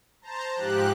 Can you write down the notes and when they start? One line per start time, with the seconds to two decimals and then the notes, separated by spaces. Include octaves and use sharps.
0.21 C5 A5 A#5
0.53 G#2 F3 G4 F#6